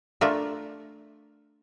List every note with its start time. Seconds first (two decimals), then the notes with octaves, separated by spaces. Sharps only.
0.21 A3 D4 F4 A#4 E5